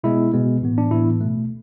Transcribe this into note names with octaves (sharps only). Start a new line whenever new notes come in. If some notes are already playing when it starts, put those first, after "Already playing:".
B2 G#3 B3 E4
B2 G#3 B3
A2 E3 B3
D4
A2 E3 B3 E4
B2 A3